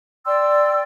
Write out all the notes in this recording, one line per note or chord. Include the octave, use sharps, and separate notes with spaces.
D5 G5 C6 E6